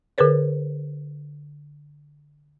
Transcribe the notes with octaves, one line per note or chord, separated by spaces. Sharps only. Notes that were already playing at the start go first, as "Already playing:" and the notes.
D3 G#4 A#4 B4 C#5